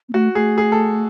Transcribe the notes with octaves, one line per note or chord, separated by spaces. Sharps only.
B3
A3 F#4
A3 G#4
G#4
A4